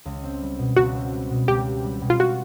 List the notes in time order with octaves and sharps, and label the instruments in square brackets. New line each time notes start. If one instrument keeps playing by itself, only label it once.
[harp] C#2
C4
G3
B2
[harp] C#2 [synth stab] F#4
[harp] C4
G3
B2
[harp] C#2 [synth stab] G4
[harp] C4
G3
B2
[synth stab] F4
F#4